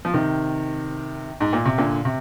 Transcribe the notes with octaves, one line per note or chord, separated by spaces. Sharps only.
F3
C3 D#3
G#2
A#2
C3
A#2 D3
C3